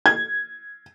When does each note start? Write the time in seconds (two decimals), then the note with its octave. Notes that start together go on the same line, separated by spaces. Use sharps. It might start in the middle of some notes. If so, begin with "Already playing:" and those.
0.06 G#6